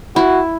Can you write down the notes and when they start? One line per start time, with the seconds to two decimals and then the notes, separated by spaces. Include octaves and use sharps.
0.16 E4 F#4